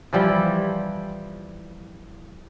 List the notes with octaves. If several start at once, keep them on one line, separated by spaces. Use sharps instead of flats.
E3 F3 G3 E4